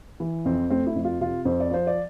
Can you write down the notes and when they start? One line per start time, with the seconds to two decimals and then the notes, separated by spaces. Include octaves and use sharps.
0.20 E3
0.45 F2 C4
0.70 A3 C4
0.87 E4
0.96 F2
1.05 F4
1.20 C3 F4
1.45 F2 C5
1.60 D5
1.71 F3 C5
1.87 D5